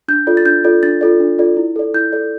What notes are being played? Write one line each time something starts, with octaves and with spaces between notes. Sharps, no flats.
D4 G6
F4 A4 D5
A6
D4 G6
F4 A4 D5
D4 A6
F4 A4 D5
D4
F4 A4 D5
E4
A4 D5
E4 G6
A4 D5